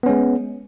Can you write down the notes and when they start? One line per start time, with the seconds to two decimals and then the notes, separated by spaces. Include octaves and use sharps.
0.03 B3
0.06 C#4
0.09 G#3